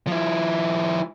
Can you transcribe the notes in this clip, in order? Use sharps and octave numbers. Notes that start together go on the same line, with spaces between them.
F3 E4